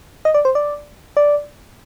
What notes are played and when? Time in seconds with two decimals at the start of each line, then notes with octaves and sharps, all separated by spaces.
0.25 D#5
0.34 D5
0.45 C5
0.55 D5
1.17 D5